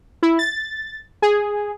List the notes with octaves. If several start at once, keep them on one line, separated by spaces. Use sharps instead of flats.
E4
A6
G#4